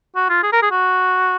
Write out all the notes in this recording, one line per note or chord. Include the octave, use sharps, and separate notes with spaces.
F#4
F4
G#4
A#4
G#4
F#4